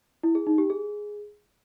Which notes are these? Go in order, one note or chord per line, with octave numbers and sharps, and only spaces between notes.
E4
G#4
D#4
G4
G#4